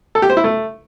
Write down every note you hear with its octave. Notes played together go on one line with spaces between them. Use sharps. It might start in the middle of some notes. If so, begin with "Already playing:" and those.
A4
G4
C5
E4
A3